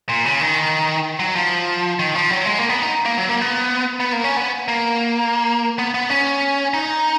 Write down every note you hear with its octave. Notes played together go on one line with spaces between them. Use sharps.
A#2
C#3
D#3
F#3
F3
D#3
F3
F#3
G#3
A#3
B3
D#4
A#3
F#3
A#3
B3
B3
A#3
C#4
B3
A#3
B3
B3
C#4
D#4